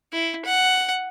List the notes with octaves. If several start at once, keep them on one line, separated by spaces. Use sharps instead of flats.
E4
F#5